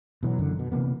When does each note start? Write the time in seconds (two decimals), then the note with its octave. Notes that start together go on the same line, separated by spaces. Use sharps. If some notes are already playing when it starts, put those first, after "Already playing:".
0.23 B2 E3 F#3
0.39 F#1 F#2 D3 D#3
0.59 B2
0.72 C3 E3 A#3 B3